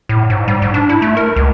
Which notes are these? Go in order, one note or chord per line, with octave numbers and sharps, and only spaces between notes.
A2
G#2
G3
G#2
D4
E4
A3
A#4
C#2